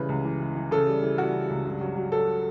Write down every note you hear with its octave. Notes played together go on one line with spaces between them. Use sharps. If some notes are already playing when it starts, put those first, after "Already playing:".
Already playing: C#3 E3 G3 B4
C#2
E3
E3
E3
C#3 A4
G3
E3
G3 F#4
C#3
C#2
G2
F#3
F#3
F#3 A4